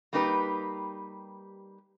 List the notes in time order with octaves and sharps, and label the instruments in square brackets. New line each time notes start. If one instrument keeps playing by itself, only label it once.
[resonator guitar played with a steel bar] G3 A#3 D#4 G4 B4